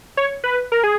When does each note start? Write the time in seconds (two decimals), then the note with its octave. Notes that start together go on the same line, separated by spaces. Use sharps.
0.17 C#5
0.44 B4
0.72 A#4
0.84 G#4